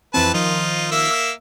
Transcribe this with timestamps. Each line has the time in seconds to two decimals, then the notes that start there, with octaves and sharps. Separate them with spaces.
0.14 F2 E3 C4 B4 A5
0.34 D#3 F3 D#4 F4
0.91 A#3 E5 E6